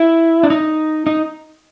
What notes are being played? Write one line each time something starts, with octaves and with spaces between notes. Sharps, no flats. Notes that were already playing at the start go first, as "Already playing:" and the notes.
Already playing: E4
D4
D#4
D#4